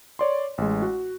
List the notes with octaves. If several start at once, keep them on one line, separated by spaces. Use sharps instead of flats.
C#5 D5 C6
A1 G#3
F#4